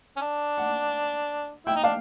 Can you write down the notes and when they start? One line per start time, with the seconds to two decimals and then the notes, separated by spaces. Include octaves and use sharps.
0.16 C#4
0.21 D4
0.58 F#5
1.66 E4 G5
1.75 D#4
1.84 D4 F5